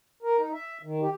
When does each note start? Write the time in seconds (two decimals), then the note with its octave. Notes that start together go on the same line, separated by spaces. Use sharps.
0.22 A#4
0.38 D#4
0.53 E5
0.83 D#3
1.01 G4